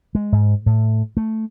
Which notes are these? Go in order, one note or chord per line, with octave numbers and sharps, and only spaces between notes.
G#3
G#2
A2
A3